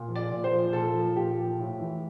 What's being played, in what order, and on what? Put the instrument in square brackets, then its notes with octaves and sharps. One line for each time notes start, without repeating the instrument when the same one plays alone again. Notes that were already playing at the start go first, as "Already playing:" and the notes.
Already playing: [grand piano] A#2
F3
D5
A#2
C5
F3
A#2 A4
F3
A#2 G4
F3
A2
E3